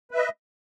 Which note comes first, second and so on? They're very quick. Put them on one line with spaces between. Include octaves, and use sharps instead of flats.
B4 E5 D#5